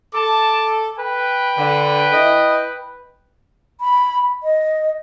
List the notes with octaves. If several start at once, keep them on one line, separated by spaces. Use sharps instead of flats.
A4 A5 D6
B4 G5
D3
E4 D#5
B5
D#5